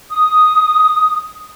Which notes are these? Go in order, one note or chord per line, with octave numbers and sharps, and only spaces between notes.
D#6